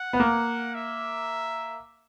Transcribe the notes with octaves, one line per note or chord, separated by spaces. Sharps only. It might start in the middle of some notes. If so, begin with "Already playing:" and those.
Already playing: F#5
B3
A#3
E5